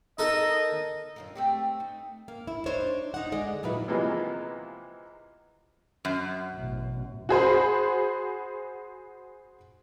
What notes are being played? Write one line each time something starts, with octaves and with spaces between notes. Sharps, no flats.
D#4 A4 A#4 D#5
F#2 F4 A#4
A3 C4 G4
D#4
A#3
E4
D4 D#4 C5 C#5
D#4 F#5
D3 G#3 D5 D#5
A#2 F#3 D#4 E4 B4
C3 E3 F3 G#3 A#3 B3
F#2
A1 B2
F#4 G#4 C5 B5